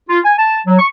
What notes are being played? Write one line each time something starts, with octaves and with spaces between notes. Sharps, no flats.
F4
G#5
A5
F#3
C#6